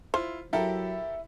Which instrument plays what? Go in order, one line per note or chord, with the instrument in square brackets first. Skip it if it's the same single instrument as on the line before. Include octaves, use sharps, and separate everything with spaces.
[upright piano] E4 F4 [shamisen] C5
[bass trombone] F#3 [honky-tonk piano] E4 [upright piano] G4 A4 A#4